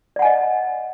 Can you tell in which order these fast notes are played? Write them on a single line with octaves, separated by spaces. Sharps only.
D5 F#5 G#5 D#5